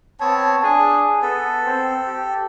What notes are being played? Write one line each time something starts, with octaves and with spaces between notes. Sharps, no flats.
B3 C4 C#5 A5
D4 G#4
B3 A4
C4
G4